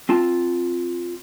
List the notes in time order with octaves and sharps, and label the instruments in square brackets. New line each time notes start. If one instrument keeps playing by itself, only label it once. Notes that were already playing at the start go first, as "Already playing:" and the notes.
[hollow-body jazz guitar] C4 F4 A5